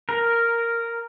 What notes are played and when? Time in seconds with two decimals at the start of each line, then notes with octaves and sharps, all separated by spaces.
0.09 A#4